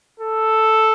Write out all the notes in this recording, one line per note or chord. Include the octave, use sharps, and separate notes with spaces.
A4